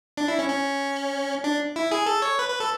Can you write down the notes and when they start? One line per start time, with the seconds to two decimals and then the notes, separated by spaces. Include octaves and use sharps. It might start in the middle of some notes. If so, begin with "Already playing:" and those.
0.17 D4
0.28 E4
0.39 C#4
0.49 C#4
1.44 D4
1.76 E4
1.91 G#4
2.06 A4
2.22 C#5
2.39 B4
2.49 B4
2.60 A4